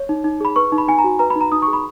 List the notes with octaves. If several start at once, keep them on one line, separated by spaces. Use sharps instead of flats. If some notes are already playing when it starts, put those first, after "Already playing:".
Already playing: C#5
D#4
D#4
G#4 B5
B4 C#6
D#4
B5
D#4 G#5
A#5
F#4
B4 A#5
B5
D#4
A#5
D#4 D#6
C#6
G#4
B5